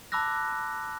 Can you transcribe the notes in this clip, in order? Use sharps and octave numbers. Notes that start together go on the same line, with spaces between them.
A5 B5 D6 E6 F#6 A#6